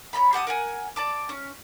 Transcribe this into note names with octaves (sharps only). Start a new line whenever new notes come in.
C#5 D#5 A#5 B5
G4 F#5 A5 D#6
A#4 F#5 G#5
D5 A5 D6
C#4